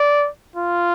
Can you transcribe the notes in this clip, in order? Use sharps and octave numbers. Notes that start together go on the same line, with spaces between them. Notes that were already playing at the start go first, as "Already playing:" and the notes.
Already playing: D5
F4